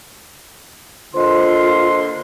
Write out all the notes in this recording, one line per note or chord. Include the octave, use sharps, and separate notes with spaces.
D3 A#3 F4 C5 D#5 C6